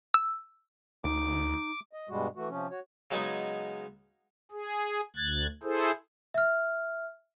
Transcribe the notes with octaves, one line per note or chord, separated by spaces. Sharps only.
E6
D2 D#4 D6
D#5
G2 B2 G3 G#3 F#4
E3 A3 F#4
C3 F3 C#4
F#4 C#5
C#3 F#3 G#3 B3 D#4
G#4
D2 F#6 G#6 A6
E4 G#4 A4 C5
E5 F6